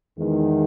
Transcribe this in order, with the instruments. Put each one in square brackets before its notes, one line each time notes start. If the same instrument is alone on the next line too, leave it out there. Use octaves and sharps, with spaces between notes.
[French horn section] E2 D#3 G#3